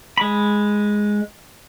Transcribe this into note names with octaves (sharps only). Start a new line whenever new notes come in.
G#3 B5